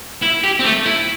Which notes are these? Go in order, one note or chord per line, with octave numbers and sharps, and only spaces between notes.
E4
G4
C4
A3
E4